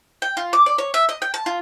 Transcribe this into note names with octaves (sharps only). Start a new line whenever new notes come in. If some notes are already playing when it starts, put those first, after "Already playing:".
G5
F4
D6
D5
C#5
E5
D#5
G5
A5
F4